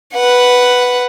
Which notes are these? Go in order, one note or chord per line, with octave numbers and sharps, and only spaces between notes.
B4 F#5